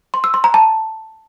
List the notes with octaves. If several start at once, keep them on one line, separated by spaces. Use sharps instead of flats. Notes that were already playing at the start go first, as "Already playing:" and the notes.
C6
E6
C6
A#5
A5